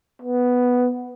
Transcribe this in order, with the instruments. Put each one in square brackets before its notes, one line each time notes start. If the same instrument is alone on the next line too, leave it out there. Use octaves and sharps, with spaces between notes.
[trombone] B3